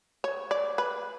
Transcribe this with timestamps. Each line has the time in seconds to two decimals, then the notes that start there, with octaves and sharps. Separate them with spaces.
0.24 C#5
0.51 D5
0.78 B4